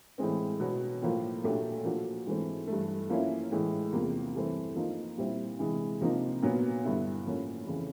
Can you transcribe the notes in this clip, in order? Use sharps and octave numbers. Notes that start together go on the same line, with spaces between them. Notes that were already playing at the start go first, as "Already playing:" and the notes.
A2 E3 G#3 C4
B2 F#3 B3
A2 F3 A#3
A#2 F#3 A3 D4 G4
F3 A#3 D4 F#4
G#2 E3 A3 C4
G2 E3 A3
F3 A#3 C#4 E4
A2 E3 G#3
E2 C3 F3 A#3
G2 E3 A3 C4
F3 A#3 D#4
A#2 G3 C4 E4
C3 E3 G#3
C3 F3 A#3 D#4
A#2 F#3 B3
G2 D3 G3 B3 E4
A2 F3 A#3 C#4
F2 C#3 E3